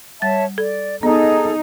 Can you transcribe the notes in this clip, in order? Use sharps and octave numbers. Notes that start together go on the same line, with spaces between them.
G3 C#5 E5 A5 A6
A4 D5
B3 D#4 G#4 A4